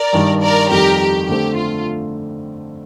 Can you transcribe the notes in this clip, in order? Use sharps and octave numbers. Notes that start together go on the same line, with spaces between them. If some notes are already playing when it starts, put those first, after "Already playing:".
Already playing: A#4 D5
G2 D#3 G3
A#4 D5
F2 D#3 G3 G4 A#4
G4
D3 A3 C4 G4
F4